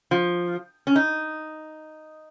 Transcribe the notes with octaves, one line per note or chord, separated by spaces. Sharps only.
F3
C#4
D#4